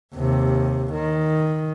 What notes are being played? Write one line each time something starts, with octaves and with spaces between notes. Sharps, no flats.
D#2 C3
D#3